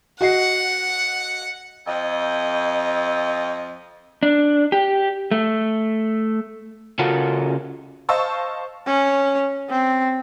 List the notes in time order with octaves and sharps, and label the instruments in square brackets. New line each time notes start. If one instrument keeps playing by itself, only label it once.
[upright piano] F#4 D#5 C7 [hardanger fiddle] F#5
[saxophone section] F2 D#5
[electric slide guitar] D4
G4
A3
C#3 C#4 F4 F#4 A4 A#4
[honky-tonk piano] C5 D#5 F5 A5 C#6 E6
[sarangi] C#4
C4